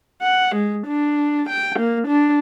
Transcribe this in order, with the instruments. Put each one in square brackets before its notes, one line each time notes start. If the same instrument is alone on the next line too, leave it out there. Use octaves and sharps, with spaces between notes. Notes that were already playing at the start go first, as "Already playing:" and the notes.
[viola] F#5
G#3
D4
G5
A#3
D4